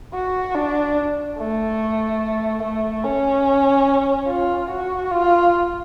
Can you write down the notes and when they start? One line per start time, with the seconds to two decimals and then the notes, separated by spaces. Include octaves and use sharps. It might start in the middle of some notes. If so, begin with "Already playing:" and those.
0.14 F#4
0.55 D4
1.38 A3
2.63 A3
3.04 C#4
4.28 F4
4.70 F#4
5.11 F4